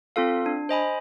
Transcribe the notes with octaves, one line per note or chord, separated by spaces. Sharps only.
C4 F4 A4 F5
D4
C5 D#5 G#5 B5